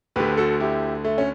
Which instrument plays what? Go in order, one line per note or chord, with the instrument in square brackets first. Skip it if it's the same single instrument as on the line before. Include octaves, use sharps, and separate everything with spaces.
[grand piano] D2 D3 G4 B4
F#4 A4
E4 G4
A3
C#4